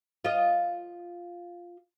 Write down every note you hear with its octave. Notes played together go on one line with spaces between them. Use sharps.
F4 D#5